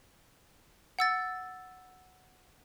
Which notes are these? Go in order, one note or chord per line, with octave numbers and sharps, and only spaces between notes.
F#5 E6 A6